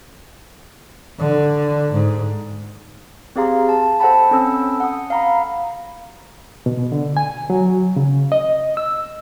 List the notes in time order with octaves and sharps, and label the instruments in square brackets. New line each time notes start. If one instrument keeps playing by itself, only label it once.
[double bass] D3
G#2
[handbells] C4 G4 G#4 F5 A#5 C6
A5
A4 C5 F#5 G5 A5 B5
C4 C#4 A4 B5 E6
F#5 D#6
F5 A#5 B5
[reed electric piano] B2
D3
G#5
F#3
C#3
D#5
E6